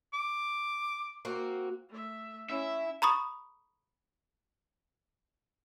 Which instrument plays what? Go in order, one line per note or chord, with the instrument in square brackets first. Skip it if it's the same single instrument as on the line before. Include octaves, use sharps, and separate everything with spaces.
[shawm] D6
[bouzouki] A#3 C4 F#4
[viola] A3 E5
[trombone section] C#4 [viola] E4 [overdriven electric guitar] E5
[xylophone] A#5 B5 C#6 D#6